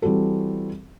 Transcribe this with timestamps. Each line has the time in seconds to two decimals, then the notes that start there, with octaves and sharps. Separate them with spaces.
0.02 E3 G3 C4 F#4 A4